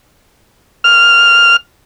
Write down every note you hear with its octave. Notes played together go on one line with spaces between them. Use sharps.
F6